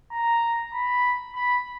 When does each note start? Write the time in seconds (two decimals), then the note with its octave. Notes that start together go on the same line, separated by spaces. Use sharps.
0.12 A#5
0.74 B5
1.35 B5